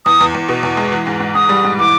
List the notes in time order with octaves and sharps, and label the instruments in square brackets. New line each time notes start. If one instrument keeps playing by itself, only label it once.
[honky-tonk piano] E2 [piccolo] D#6
[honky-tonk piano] E2
E2
B2
E2
G#3
E3
G#2
G#2
[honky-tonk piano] G#2 [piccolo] D#6
[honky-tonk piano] G3
G#2
[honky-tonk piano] E3 [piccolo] D6